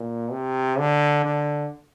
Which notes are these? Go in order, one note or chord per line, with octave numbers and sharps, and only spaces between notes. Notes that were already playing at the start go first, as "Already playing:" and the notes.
Already playing: A#2
C3
D3
D3